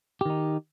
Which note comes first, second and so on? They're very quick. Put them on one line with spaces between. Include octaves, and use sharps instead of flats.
G4 D#3 D#4